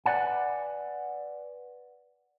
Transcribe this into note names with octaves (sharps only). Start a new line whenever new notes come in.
B4 C5 D5 F#5 G#5